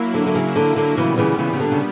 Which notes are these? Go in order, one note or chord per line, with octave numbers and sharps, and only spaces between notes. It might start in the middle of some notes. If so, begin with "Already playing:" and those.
Already playing: F#3 A#3 E4
D3
D3
C#3
D3
D3
A#2 C#3 E3 G3 B3
C#3 E3
C#3 E3
C#3
D3
C#3